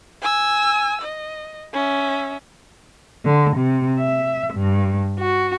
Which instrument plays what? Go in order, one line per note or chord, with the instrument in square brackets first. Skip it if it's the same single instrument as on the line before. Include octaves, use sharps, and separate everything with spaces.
[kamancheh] G#5 E6
D#5
C#4 E5
[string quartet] D3
C3
E5
G2
F#4